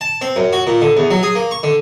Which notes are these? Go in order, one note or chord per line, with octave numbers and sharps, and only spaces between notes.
A5
C4
F#2
F#4
A#2
D3
E2
F#3
G#4
A#3
C#6
D3